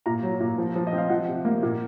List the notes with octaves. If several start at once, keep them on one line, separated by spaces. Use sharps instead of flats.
A#2 A#5
F#3
A#2
F3
F3
D#5
C4
F5
F3 F#5
C3
A#3
A#2